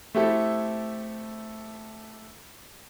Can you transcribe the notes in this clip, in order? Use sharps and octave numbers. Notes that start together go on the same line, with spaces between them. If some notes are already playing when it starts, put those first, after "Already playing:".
A3 C4 E4 G4 A4